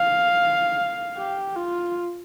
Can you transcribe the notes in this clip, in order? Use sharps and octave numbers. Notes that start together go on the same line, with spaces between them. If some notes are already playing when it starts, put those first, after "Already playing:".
Already playing: F5
G4
F4